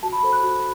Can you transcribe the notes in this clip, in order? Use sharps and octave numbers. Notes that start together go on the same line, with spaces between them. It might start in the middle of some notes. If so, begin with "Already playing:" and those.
F#4 A5
B5
A4 C5
F#6
F#4